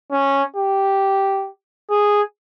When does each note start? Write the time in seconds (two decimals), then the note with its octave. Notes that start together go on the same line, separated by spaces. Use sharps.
0.12 C#4
0.56 G4
1.90 G#4